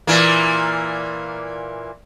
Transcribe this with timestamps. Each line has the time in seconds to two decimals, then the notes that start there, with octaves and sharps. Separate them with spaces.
0.07 A#2 E3 A#3